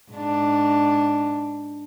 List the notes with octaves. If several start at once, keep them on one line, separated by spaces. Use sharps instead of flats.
G#2 D4